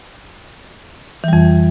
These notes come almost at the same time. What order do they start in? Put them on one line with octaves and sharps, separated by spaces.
E3 G3 F2